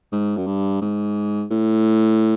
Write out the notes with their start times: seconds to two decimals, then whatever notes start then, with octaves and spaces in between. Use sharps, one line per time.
0.12 G#2
0.37 F#2
0.47 G2
0.82 G#2
1.51 A2